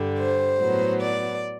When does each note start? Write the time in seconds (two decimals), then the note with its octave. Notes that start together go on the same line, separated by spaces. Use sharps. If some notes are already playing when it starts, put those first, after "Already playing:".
Already playing: G2 D3 G3
0.19 C5
0.60 A2 F#3 B3
1.00 D5